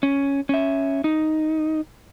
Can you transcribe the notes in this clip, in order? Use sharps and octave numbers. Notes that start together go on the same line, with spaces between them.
C#4
C#4 E5
D#4